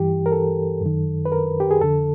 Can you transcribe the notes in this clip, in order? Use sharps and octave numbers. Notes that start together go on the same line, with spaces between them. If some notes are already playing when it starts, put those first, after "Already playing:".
Already playing: G2 E3 G4
A#4
A4
F#2 D#3
B4
A#4
G4
G#4
F2 D3 A4